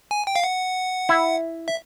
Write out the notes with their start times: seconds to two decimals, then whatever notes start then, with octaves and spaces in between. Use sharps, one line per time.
0.11 G#5
0.27 G5
0.36 F5
0.44 F#5
1.09 E4
1.68 E5